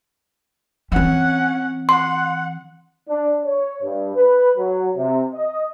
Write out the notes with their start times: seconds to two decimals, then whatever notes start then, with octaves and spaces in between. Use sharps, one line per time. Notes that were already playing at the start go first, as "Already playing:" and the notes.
0.92 E3 C4 C#4 F#5
1.89 F#5 C6
3.08 D4
3.44 C#5
3.83 G2
4.16 B4
4.57 F#3
4.95 C3
5.34 D#5